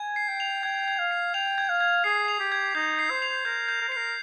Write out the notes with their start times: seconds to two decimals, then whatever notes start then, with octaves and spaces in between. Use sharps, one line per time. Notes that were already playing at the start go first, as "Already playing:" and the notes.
Already playing: G#5 G#6
0.16 C7
0.28 G5
0.40 F7
0.63 G5 G#6
0.88 G#6
0.99 F5
1.11 C7
1.34 G5 F7
1.58 G#6
1.69 F5
1.81 G#6
2.04 G#4 C7
2.28 F7
2.40 G4
2.52 G#6
2.75 D#4 G6
2.99 C7
3.10 C5
3.22 F7
3.45 A#4 G6
3.68 G6
3.81 A#4
3.89 C5
3.92 A#4 C7